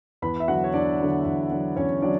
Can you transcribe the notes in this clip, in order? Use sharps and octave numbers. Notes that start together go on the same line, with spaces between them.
E2 B4 B5
E5
D3 F#3 F#4 F#5
C#5
E2 D4 D5
D3 F#3
E2
D3 F#3
E2 C#4 C#5
D3 F#3 D4 D5